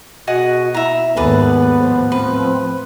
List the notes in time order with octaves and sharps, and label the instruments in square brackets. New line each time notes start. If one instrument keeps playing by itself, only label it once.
[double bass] B2 [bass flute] F#4 [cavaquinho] G#4 D#5 F#5
[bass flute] E4 [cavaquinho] E5 A#5
[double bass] D#2 G#2 [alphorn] B3 [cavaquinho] G#4 B4 D5 [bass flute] A4
[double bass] A2 F3 [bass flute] C5
[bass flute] C4 [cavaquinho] B4